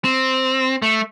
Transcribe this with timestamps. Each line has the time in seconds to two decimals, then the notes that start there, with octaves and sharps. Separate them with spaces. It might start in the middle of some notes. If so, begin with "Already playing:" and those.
0.04 C4
0.82 A3